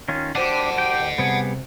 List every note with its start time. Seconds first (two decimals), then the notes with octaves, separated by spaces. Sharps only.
0.08 D#3 C#4 F4
0.35 D4 F#4 G4 C5 D#5 F#5 A5
0.78 G4 G5
0.99 D2 D#5
1.18 C3 G3 B3 G#4